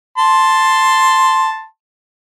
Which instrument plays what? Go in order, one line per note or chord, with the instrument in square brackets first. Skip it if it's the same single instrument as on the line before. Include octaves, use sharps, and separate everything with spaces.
[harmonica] A5 C6